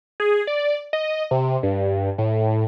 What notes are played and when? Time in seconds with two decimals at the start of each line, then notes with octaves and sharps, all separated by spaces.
0.20 G#4
0.47 D5
0.93 D#5
1.31 C3
1.63 G2
2.18 A2